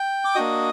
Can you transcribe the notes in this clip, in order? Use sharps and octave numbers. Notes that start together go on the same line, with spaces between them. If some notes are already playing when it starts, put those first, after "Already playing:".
Already playing: G5
D6
A#3 D4 F#4 D#5 D#6